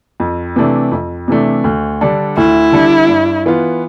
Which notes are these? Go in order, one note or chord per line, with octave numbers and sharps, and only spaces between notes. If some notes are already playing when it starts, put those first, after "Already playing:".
F2
C3 E3 A3 D4
F2
C3 E3 A3 D4
D2
D3 G3 D4 A4
D2 E4
D3 G3 D4 A4
G2
E3 B3 F4